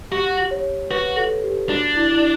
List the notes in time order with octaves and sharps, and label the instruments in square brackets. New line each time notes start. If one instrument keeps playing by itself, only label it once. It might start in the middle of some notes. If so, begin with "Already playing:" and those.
[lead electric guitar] F#4 [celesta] G4
[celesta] C#5
[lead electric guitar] F#4 [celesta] B4
[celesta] A4
G4
[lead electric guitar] D4 [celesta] F#4
[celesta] E4
E4